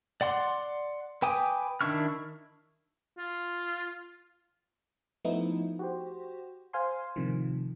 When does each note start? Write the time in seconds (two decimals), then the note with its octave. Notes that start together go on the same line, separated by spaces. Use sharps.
0.21 D5 F#5 C6 D6
1.22 B4 G5 G#5 D6 D#6
1.81 D#3 D4 E4 C#6 F6
3.18 F4
5.24 F3 A3 B3 D#4 E4
5.79 F#4 G4 C5
6.73 C5 F5 G#5 C6
7.16 A2 C3 D#3 F3